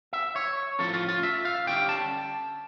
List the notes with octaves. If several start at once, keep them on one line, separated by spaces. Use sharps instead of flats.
E5
C#5
A2 F3 C#4 A4
F4
F4
E5
F5
D3 G3 C#4 G5
A5